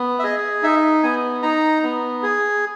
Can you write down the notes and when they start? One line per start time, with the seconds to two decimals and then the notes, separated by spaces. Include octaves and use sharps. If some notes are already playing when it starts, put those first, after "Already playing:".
Already playing: B3
0.19 E5
0.24 G#4 D#5
0.63 D#4 E5
1.03 B3 G#5
1.42 D#4 A#5
1.83 B3
2.23 G#4